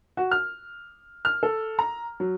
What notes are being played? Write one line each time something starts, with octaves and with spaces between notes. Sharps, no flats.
F#4
F6
F6
A4
A#5
F#3